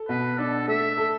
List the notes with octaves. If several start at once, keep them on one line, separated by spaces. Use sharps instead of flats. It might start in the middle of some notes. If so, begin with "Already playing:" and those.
Already playing: A4
B2 B4
D4 A4
A3 E5
A4